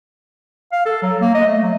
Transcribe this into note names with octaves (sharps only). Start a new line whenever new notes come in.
F5
A4
F#3
A#3
D#5
A3
F#3